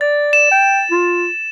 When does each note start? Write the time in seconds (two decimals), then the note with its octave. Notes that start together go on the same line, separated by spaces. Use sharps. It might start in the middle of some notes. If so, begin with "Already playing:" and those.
0.01 D5 A6
0.33 E7
0.51 G5
0.91 F4